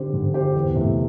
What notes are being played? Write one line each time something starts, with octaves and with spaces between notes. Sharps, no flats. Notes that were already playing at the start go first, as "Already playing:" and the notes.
Already playing: D3 C4 G4 C5
D3
C4 G4 C5
E2
C3 A3 E4